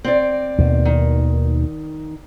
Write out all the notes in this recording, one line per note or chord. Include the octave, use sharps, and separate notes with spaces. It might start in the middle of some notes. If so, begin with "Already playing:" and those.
C4 D5
D#2 B2
D#3